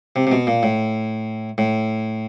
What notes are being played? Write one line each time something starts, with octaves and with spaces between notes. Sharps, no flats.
C3
C3
B2
A#2
A2
A2